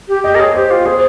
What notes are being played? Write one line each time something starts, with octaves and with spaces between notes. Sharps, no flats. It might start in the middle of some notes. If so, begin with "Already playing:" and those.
G4
G4 D#5
A#4
G#4 C#5
G4 C5
F4
G#4 C5